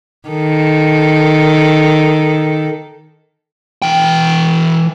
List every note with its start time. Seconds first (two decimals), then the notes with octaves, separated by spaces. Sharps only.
0.29 D#3 A4
3.82 E3 G5